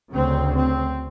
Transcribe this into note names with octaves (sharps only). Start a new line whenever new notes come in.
D2 C#3 C4
C4